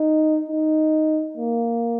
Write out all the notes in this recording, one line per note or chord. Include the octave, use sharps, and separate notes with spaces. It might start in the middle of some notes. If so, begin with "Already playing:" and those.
Already playing: D#4
D#4
A#3